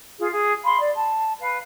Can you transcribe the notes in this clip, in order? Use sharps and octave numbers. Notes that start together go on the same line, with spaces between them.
F4 G#4
G#4
F5 B5 C6
D5
A5
B4 F5